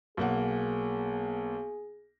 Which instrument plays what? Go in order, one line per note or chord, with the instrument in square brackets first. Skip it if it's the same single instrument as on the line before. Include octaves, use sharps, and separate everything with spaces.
[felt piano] B1 A#3 F#5 [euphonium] G#4